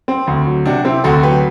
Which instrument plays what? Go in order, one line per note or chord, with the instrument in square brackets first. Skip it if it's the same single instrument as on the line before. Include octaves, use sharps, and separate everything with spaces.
[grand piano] C4
D2
F#3
[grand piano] C3 [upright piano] D4 F#4
[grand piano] C4 [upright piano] E4 G4
[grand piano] D2 [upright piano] F#4 A4
[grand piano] F#3 [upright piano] G4 B4